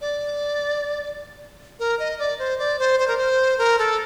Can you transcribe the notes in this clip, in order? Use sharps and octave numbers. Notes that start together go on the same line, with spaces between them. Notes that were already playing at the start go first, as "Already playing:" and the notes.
D5
A#4
D#5
D5
C5
D5
C5
C5
A#4
C5
A#4
A4